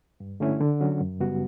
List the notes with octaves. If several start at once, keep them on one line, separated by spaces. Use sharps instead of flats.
G2
D3 A3 C#4 E4
D3
F#3 C#4 F#4
F#2
C#3 G3 B3 F#4